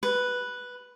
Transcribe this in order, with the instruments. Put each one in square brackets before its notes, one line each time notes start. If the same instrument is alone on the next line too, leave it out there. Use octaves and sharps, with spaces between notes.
[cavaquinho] B4